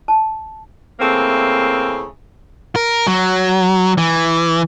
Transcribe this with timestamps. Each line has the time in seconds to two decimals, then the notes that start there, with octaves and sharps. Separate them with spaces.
0.08 A5
1.00 C#3 E3 A3 A#3 C4
2.76 A#4
3.07 F#3
3.98 E3